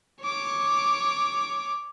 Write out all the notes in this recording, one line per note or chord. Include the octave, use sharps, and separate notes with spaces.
C#5 D6